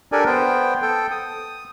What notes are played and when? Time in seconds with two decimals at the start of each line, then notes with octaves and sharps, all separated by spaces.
0.12 D4 G4 A4 A#4 D5 G#5
0.26 B3 C5 G5
0.82 A4 G5
1.11 D#6